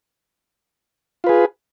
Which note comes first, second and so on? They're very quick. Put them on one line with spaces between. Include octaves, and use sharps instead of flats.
F4 B4 G#4